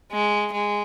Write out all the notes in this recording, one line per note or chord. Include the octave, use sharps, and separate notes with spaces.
G#3
G#3